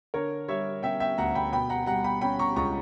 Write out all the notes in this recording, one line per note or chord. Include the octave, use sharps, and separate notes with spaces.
D3 A#4 C#5
G3 C#5 E5
C#4 E5 G5
E5 G5
D2 F#5 A#5
G5 B5
B2 G5 B5
F#5 A#5
G3 F#5 A#5
G5 B5
C#4 G5 B5
A#5 C#6
C#2 A#5 C#6